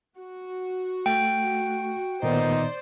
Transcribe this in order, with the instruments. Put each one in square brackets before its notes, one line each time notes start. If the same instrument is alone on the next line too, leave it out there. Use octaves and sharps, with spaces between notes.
[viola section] F#4
[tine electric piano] A3 [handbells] G5 D7
[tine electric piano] A#2 D#3 B3 [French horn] D#4 [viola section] C5 D5